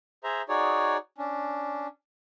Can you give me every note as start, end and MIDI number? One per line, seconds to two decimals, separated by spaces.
0.24 0.42 68
0.24 0.42 72
0.24 0.42 76
0.24 0.42 82
0.49 0.97 63
0.49 0.97 66
0.49 0.97 68
0.49 0.97 73
0.49 0.97 74
1.18 1.87 61
1.18 1.87 62